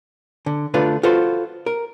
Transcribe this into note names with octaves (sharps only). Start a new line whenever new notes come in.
D3
D3 A3 D4 F4 B4
F4 F#4 A4 B4 C5
A#4